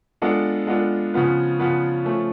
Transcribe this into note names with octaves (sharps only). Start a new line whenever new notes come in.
G#3 B3 D4 F4 A4
G#3 B3 D4 F4 A4
C#3 F3 B3 F4 B4
C#3 F3 B3 F4 B4
F3 A3 C#4